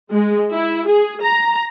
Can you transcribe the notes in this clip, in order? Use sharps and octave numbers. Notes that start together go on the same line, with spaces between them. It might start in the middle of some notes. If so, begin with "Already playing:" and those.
G#3
E4
G#4
A#5